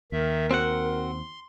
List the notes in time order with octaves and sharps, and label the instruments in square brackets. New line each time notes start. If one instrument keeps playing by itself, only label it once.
[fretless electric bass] D#2 [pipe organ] D#3 E5 [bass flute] A#4
[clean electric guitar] C4 F#4 F#5 [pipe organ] C6